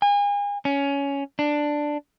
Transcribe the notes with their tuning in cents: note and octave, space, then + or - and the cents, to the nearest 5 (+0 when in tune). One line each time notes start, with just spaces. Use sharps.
G#5 -35
C#4 +15
D4 +5